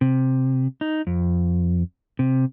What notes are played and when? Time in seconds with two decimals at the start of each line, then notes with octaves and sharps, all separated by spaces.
0.01 C3
0.81 D#4
1.07 F2
2.19 C3